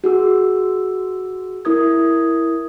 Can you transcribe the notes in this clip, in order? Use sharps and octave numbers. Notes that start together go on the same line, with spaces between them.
F#4 G#4 E6
E4 A#4 D#6 G#6